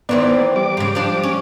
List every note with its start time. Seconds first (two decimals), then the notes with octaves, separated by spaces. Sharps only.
0.09 D#3 E3 B3 C4 D5
0.56 G3 D6
0.77 G#2 C#3
0.95 F3 D4
1.23 C#4